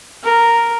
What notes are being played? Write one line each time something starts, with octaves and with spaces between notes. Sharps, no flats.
A#4